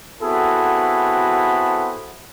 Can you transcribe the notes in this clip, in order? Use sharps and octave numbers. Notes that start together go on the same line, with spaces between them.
B3 C4 E4 F#4 G#4 A4